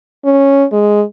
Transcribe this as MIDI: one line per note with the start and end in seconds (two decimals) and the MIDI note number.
0.25 0.64 61
0.72 1.03 56